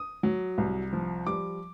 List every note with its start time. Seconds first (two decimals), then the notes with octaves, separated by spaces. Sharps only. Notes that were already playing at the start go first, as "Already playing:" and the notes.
Already playing: D#6
0.23 F#3
0.58 C2
0.93 F3
1.27 G3 D6